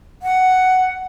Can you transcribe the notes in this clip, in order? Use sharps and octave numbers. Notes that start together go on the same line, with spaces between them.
F#5